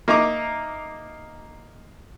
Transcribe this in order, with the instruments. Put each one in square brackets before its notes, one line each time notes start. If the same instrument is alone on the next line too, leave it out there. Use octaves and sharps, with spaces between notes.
[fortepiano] A#3 D#4 D#5 E5 A#5 D6